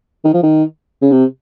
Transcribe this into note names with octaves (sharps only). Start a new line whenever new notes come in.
D#3
F3
D#3
C#3
C3